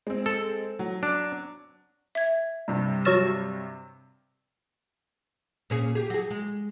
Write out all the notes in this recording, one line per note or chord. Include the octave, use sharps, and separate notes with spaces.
G#3 C4
A4
F#3
D4
E5 G#6
G2 C3 G3
F#3 C#5 E6 F6 A6 A#6
A#2 C#4 G#4
G4 G#4
F#3 G#4
G#3